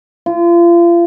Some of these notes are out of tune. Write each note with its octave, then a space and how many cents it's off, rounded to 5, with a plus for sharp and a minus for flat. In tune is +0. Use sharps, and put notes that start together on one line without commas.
F4 -35